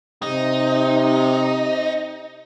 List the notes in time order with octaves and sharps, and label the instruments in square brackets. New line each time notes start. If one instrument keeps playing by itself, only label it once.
[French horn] C3 [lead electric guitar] D#4